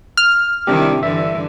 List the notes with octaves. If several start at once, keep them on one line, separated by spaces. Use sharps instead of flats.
F6
C3 D#3 G3 D4 E4 G4
G2 D3 E3 E5